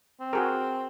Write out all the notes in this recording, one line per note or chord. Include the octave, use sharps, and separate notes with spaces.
C4
F#4 G#4 A#4